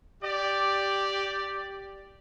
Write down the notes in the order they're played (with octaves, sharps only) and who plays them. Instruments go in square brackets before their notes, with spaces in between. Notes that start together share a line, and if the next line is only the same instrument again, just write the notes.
[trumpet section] G4 D5